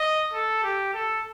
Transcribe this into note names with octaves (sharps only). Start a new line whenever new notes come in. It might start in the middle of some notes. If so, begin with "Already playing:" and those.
Already playing: D#5
A4
G4
A4